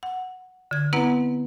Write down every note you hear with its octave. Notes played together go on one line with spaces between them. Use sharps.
F#5
D3 G#6
B3 C4 E4 B4 F#5 A#5